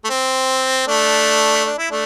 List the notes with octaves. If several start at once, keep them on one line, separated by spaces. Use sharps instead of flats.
A3
C4
A3 D4
D4
E4
A3 D4